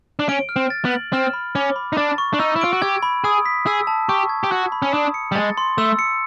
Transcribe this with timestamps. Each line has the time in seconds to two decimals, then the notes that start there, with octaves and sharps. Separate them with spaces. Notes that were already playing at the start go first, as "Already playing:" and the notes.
0.19 D4
0.29 C#4 D7
0.49 F6
0.56 C4
0.70 A6
0.85 B3
0.92 F#7
1.13 C4 F6
1.33 B5
1.55 C#4 D6
1.76 B5
1.93 D#4
1.97 D4 A6
2.18 C#6
2.34 D4
2.40 D#4 E6
2.56 E4
2.61 F4 D7
2.73 F#4
2.82 G4 G#6
3.03 B5
3.24 G#4 D#6
3.46 B6
3.66 G#4 E6
3.87 A5
4.09 G4 C#6
4.29 G#6
4.44 G4
4.51 F#4 G#6
4.72 B5
4.82 C#4
4.94 D4 D#6
5.14 C#7
5.32 G3
5.35 G#3 A6
5.58 C6
5.78 A3 E6
5.99 C#7